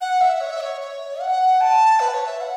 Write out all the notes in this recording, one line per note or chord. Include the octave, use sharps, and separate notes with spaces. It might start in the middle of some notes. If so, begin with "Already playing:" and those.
F#5
E5
C#5
E5
C#5
C#5
F#5
A5
B4
C#5
E5
F#5